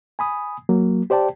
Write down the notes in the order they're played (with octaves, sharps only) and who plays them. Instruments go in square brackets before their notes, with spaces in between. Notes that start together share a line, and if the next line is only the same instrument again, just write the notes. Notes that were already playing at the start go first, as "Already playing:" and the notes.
[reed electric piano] G#5 B5 D#6
F#3 A#3
G4 C5 D5 G5 A5